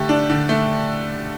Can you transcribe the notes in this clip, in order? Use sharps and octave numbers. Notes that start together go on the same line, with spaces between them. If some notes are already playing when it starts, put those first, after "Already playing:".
Already playing: D3 A3 G4
D4
D3
A3